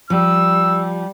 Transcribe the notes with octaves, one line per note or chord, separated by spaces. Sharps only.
F3 G3 E6